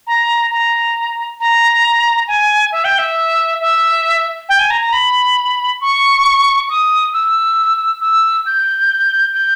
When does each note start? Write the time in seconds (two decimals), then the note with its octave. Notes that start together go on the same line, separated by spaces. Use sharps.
0.07 A#5
0.51 A#5
1.40 A#5
2.28 G#5
2.72 E5
2.84 G5
2.98 E5
3.61 E5
4.49 G5
4.59 G#5
4.70 A#5
4.81 A#5
4.93 B5
5.81 C#6
6.70 D#6
7.13 E6
8.01 E6
8.46 G6
9.33 G6